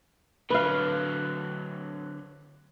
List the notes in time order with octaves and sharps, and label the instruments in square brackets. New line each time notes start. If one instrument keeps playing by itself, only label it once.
[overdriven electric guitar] D3 F#3 [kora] B4 F5